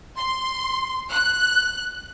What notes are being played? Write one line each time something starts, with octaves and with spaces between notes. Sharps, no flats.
C6
F#6